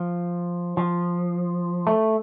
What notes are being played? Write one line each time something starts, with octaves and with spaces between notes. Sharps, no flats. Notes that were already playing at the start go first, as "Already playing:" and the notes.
Already playing: F3
F3
A3